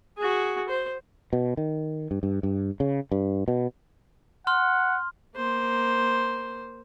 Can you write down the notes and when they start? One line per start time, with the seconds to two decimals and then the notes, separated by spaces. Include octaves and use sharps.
0.18 F#4 G#4
0.69 C5
1.33 B2
1.57 D#3
2.11 G2
2.23 G2
2.43 G2
2.80 C#3
3.12 G2
3.48 B2
4.47 F#5 C6 F6
5.36 A#3 C5